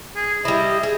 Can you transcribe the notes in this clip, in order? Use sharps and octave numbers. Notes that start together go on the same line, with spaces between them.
G#4
G3 E4 D#5
G#4